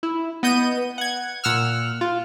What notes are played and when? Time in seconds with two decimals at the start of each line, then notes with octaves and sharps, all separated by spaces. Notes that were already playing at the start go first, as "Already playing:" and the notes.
0.03 E4
0.43 B3 D#5 G6 D#7
0.98 F#5 G#6
1.44 A#2 F#5 E6 F6
2.01 F4